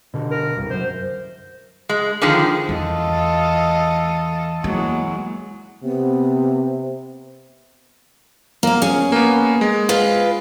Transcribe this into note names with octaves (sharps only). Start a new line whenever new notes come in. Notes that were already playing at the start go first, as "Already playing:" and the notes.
B2 D3
A#4
C2 G2
F#2 C5
G#3
D3 D#3 F3 G#4
E2 F4 A4 D#5
E2 F#3 G#3 A#3
C3 B3
A#3 F5
C#4 G#4
A#3 B3
G#3
F4 B4